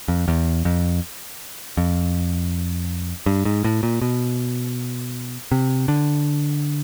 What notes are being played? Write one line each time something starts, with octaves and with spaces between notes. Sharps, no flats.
F2
E2
F2
F2
G2
G#2
A2
A#2
B2
C3
D3